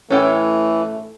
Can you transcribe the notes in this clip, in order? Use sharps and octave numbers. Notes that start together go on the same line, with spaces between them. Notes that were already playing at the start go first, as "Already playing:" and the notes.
A2 E3 A3 C#4 A4 G5